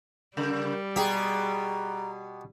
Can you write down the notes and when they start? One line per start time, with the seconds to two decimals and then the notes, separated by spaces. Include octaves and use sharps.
0.37 C#3 G3 A#4
0.96 B2 G4 G#4 A#5